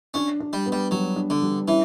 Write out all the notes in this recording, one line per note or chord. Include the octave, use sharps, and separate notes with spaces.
C#4 D4
D4
G3
B3
G3
F#3 G3
D4
D3
G3
E3 C#4